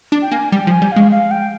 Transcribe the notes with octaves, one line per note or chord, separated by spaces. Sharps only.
D4
G5
A#3 G#5
G3 G5
F3
G#5
G3
G#3 F5
F5
G5